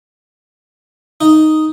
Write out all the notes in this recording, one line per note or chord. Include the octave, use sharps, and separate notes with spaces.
D#4